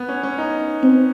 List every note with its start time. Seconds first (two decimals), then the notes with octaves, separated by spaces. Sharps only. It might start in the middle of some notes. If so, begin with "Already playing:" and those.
Already playing: B3
0.09 C#4
0.23 C#4
0.38 D#4
0.83 C4